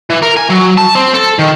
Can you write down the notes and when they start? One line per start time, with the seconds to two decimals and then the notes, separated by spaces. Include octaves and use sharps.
0.10 E3
0.23 A#4
0.37 G#5
0.50 F#3
0.77 A5
0.95 C4
1.13 A4
1.39 D#3